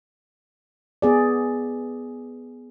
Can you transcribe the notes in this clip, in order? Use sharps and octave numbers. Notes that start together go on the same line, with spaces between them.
B3 G#4 D5